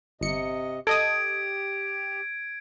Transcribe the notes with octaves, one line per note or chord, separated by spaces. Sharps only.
G1 C3 D#5 C#7
G4 A4 D#5 D#6 G#6 D7